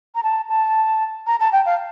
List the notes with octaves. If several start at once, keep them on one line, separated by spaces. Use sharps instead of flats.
A#5
A5
A5
A#5
A5
G5
F5